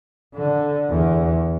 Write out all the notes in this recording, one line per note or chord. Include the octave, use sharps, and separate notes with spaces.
D3
E2